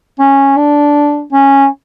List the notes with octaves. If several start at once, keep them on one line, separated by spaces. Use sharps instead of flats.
C#4
D4
C#4